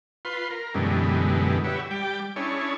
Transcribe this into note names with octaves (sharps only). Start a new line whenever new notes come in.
F4 B4 C6
A#4
F#2 B2 D3 E3 G3 G#3
F#4 G4 B4 C#5 E5
G3 G5 D6
C#4 D4 E4 G#4 C#5